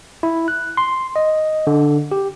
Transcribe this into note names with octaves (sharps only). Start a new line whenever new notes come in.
E4
F#6
C6
D#5
D3
G4